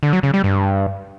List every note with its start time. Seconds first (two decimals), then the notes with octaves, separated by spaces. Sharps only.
0.03 D3
0.13 F#3
0.23 C#3
0.34 G3
0.44 G2